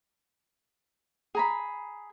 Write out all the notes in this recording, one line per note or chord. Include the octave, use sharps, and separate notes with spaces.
G#4 A#5 B5